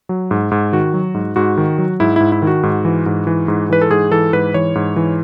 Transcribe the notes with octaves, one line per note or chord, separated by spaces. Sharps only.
F#3
G#2
G#2
D#3 F#4
F#3
G#2
G#2 F#4
D#3
F#3
G#2 E4
G#2 E4
E4
D#3
F#4
G#2
E3
G#2
E3
G#2
E3 B4
A4
G#2 G#4
E3 A4
G#2 B4
E3 C#5
G#2
E3